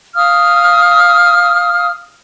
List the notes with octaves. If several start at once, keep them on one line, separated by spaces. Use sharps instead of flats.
F5 D#6 F6